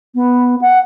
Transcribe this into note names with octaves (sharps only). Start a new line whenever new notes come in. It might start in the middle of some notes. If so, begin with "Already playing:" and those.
B3
F#5